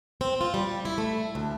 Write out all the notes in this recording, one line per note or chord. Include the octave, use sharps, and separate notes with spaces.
C4
F4
G3
E4
A3
D2